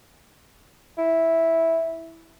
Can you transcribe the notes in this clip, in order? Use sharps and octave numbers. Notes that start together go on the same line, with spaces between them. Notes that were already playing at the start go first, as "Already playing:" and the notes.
E4